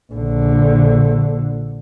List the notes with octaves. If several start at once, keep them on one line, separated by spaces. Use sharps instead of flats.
A#1 D3